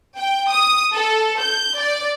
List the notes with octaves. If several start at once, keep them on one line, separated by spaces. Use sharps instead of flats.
G5
D#6
A4
G6
D5